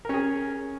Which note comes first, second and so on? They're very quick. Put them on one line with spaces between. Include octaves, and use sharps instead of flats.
A#4 C#4 G#4